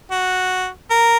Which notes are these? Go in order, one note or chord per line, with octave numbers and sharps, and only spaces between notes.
F#4
A#4